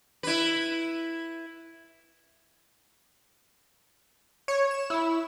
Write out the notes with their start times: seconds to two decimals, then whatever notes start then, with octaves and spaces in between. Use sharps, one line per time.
0.23 E4 B4
4.48 C#5
4.71 E7
4.90 E4